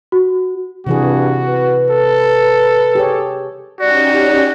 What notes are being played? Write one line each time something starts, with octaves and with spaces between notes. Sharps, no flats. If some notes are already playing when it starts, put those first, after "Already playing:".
F#4
G2 C3 E3 F#4 G#4
B4
A4
G4 G#4 C#5
C#4 D#4 F#4 G4 D5